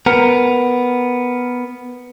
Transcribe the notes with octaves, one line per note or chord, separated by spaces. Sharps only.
B3 A#4